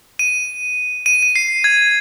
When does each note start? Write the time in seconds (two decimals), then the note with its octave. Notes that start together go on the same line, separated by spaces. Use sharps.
0.19 D#7
1.06 D#7
1.23 D#7
1.36 C7
1.64 G#6